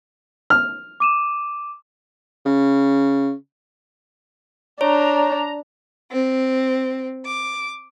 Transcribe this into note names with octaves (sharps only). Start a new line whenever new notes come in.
F6
D6 D#7 E7
C#3
D4 C#5 A#5
C4
D6